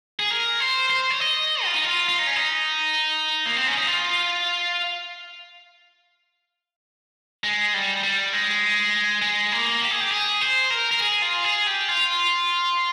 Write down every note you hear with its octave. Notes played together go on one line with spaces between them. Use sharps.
G#4
A#4
C5
C5
C#5
D#5
F4
D#4
F4
F4
D#4
C#4
D#4
A#3
C4
C#4
D#4
F4
G#3
G3
G3
G#3
G#3
A#3
G4
G#4
G4
G#4
C5
A#4
A#4
G#4
F4
G#4
G4
F4